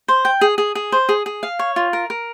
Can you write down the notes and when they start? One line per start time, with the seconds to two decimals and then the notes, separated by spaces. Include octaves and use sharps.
0.08 C5
0.25 G5
0.41 G#4
0.58 G#4
0.75 G#4
0.92 C5
1.09 G#4
1.26 G#4
1.43 F5
1.59 C#5
1.76 F4
1.93 A#4
2.10 A#4